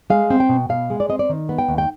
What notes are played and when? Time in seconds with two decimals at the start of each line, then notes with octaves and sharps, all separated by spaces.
0.10 G#3 F5
0.30 C4
0.40 G5
0.49 B2
0.69 B2 F5
0.90 G#3
1.00 D5
1.09 C4 D#5
1.19 D5
1.29 D#3
1.49 B3
1.58 G5
1.68 D#2
1.78 G5